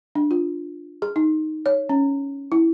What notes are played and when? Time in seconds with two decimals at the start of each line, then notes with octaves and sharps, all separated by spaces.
0.15 D4
0.31 F4
1.02 G#4
1.16 D#4
1.66 C#5
1.89 C#4
2.52 E4